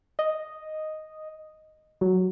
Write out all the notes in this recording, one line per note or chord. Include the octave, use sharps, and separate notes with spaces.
D#5
F#3